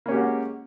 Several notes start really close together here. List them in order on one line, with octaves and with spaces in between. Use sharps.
A#3 C#4 G4 G#3 F#4